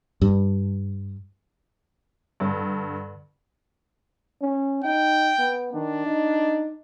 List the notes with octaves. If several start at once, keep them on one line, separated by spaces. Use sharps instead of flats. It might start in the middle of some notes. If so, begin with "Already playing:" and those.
G2
G2 D3
C#4
D#4 G5
B3
D#3 D4
D#4